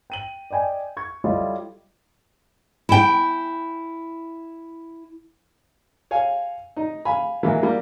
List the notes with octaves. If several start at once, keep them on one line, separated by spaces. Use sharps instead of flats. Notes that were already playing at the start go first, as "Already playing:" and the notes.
G5 D#7 F#7
D5 D#5 G5 G#5
C#6 G#6
G3 E4 F4 A4 C#5 D#5
E4 G5
C#5 F5 G#5
D#4
F5 G#5 B5
E3 F#3 G#3 A#3 E4
F#3 G3 A#3